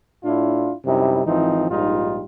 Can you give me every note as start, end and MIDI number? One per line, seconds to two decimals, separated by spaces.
0.24 0.73 45
0.24 0.73 62
0.24 0.73 64
0.24 0.73 65
0.86 1.24 42
0.86 1.24 48
0.86 1.24 55
0.86 1.24 63
0.86 1.24 64
1.25 1.67 32
1.25 1.67 52
1.25 1.67 53
1.25 1.67 60
1.25 1.67 63
1.69 2.24 34
1.69 2.24 44
1.69 2.24 55
1.69 2.24 63
1.69 2.24 65